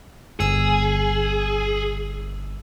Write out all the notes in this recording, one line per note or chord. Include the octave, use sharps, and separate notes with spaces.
G1 G#4 E6